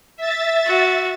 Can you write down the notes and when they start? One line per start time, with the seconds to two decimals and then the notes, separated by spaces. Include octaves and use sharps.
0.17 E5 A6
0.67 F#4